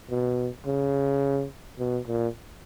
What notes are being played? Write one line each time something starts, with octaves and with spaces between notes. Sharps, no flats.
B2
C#3
B2
A#2